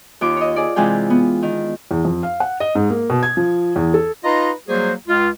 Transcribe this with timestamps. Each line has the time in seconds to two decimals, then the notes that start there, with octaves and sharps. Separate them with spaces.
0.21 D#2 F4 D6
0.37 C#5 D#5
0.56 G#4 D5
0.76 C3 E3 G#3 F4 G#4 G5
1.10 B3
1.43 D#3
1.91 E2
2.05 F2
2.23 F5
2.40 F#5
2.60 D#5
2.75 G#2
2.90 A#3
3.10 B2
3.23 G#6
3.37 F3
3.76 E2
3.94 A4
4.24 D#4 F4 B4 D#5 A#5 C6
4.69 F#3 G3 A#3 F#4 G#4 C5
5.08 C#2 F4